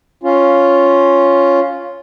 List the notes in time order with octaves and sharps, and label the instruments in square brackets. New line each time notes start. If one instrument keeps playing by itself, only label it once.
[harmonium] C#4 F4